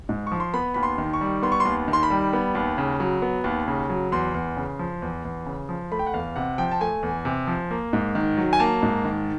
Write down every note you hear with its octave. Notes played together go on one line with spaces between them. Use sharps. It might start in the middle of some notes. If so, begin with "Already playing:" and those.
G#2
F3 C#6
C6
B3 B5
D#2 B5
C6
D#3
C#6
G3
B3 C6
C#6
C6
D#2
D#3
C6
B5
G3
B3
D#2
C#3
F#3
B3
D#2
C#3
F#3
E2 C6
E2
C#3
F3
E2
E2
C#3
F3
A3 B5
G5
F#5
E2 F5
C3 F#5
F3 G5
A5
A3 G#5
E2
C3
F3
A#3
G#2
D#3
F#3
G#5
A#3 A5
G#2
D#3